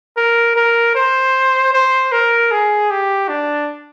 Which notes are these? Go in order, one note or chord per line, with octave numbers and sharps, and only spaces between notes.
A#4
A#4
C5
C5
A#4
G#4
G4
D4